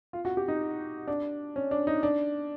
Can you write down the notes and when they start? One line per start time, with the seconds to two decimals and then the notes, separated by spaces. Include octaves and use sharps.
0.13 F4
0.25 F#4
0.37 G4
0.48 D#4
1.08 D4
1.56 C#4
1.71 D4
1.87 D#4
2.03 D4